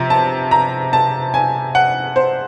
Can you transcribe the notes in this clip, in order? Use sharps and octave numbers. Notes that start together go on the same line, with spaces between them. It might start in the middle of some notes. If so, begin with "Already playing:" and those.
Already playing: C3 F3 A#5
A5
A#5
A5
G#5
F#5
C5